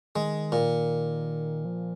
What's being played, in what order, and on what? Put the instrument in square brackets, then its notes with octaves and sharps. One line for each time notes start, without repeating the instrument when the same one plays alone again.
[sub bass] D#3 [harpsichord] G#3
[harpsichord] A#2
[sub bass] F3